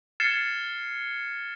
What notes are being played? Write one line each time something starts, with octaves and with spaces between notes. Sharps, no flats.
F6 G#6 A6 C7 C#7 E7